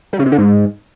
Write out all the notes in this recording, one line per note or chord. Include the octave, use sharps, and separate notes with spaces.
G3
C#3
C3
D3
G#2